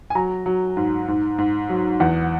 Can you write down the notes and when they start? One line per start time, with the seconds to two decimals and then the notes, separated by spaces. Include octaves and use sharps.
0.10 G#5
0.15 F#3 A#5
0.46 F#3
0.77 G#2
1.08 G#2
1.38 G#2
1.69 F#3
2.00 E2 F#5